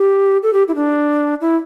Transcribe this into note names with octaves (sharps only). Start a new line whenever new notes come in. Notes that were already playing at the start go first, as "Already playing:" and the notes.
Already playing: G4
A4
G4
E4
D4
E4